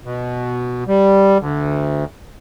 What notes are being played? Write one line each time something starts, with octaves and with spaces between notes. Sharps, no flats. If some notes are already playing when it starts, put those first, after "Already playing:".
B2
G3
D2